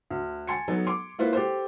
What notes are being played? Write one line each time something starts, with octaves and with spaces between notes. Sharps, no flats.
D2
G#5 A5 C6 G#6 C#7
F#3 B3 D#4 A4
C6 D6
A#3 E4 F4 B4 C5
G4 A4 C5